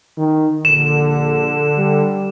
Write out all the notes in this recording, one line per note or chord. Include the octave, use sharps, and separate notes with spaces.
D#3
A#1 D3 E7
G3